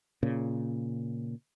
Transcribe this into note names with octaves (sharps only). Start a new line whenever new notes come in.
A#2 C#3